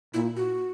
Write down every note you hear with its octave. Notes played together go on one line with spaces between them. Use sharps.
A#2 E4
F#4